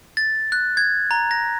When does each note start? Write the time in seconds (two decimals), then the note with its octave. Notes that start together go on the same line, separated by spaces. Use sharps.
0.17 A6
0.52 F#6
0.77 G#6
1.11 A#5
1.31 A#6